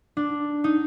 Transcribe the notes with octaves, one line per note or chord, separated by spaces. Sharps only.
D4
D#4